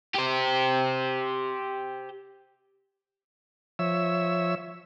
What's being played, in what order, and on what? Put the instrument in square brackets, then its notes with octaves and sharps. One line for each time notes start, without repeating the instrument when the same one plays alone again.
[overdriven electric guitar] G4 C5
[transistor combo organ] F3 C#5 E5 E6